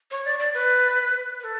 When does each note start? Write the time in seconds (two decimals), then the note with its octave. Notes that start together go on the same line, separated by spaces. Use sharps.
0.11 C#5
0.25 D5
0.39 D5
0.54 B4
1.40 B4
1.44 A4